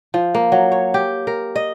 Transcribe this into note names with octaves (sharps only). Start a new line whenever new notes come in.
F3
A#3
F#3
C#5
G4
A#4
D#5